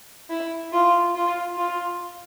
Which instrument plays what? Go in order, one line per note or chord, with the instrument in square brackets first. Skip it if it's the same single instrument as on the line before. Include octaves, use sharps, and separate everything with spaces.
[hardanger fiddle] E4
F4
F4
F4